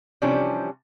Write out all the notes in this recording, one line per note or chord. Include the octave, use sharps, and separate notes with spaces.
C3 E3 F3 G3 C#4 D4